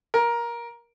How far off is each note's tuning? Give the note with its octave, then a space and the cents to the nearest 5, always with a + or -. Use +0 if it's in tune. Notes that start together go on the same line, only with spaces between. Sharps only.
A#4 +15